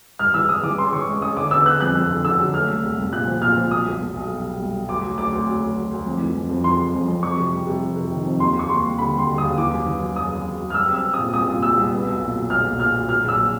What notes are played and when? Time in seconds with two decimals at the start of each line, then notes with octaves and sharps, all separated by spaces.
0.19 G2 F6
0.34 E3 E6
0.49 G2 D#6
0.63 E3 D6
0.78 C#4 C6
0.93 E3 C#6
1.07 G#3
1.22 C#4 D#6
1.37 D3 D6
1.51 B3 E6
1.66 B3 F#6
1.81 F2 F#6
1.95 F2
2.10 D3
2.24 D3 E6
2.39 F#3
2.54 A3 F6
2.69 C2
2.83 C2
2.98 C2
3.13 A#2 F#6
3.27 F3
3.41 A#2 F6
3.57 F3
3.71 B1 D#6
3.86 B1
4.00 B1
4.15 B1
4.30 G3
4.44 G3
4.59 B1
4.74 G3
4.88 D2 D6
5.03 F#3
5.18 D2 D6
5.32 D2
5.47 F#3
5.61 D2
5.76 D2
5.91 D2
6.05 F2
6.20 E3
6.35 F2
6.50 F2
6.64 E3 C6
6.79 C#3
6.94 F2
7.08 F2
7.23 F2 C#6
7.37 C3
7.52 G3
7.67 C3
7.82 F2
7.96 C3
8.11 D#3
8.26 F2
8.40 D#2 C6
8.55 D#2 C#6
8.69 D#2 C6
8.84 G3
8.98 D3 B5
9.13 G3
9.19 C6
9.28 D3
9.38 D#6
9.43 D#2
9.57 E3 D6
9.72 F#2
9.86 E3
10.01 F#2
10.16 F#2 D#6
10.30 C#3
10.45 F#2
10.60 F#2
10.70 F6
10.74 G3 E6
10.89 C4
10.94 E6
11.04 C4
11.14 D#6
11.19 A#2
11.33 C2 D#6
11.47 A#2
11.62 G3 E6
11.77 C2
11.92 B3
12.06 B1
12.21 A#2
12.35 F#3
12.50 B1 F6
12.65 A#2
12.80 A#2 F6
12.94 F#3
13.09 F#3 F6
13.24 A#1 E6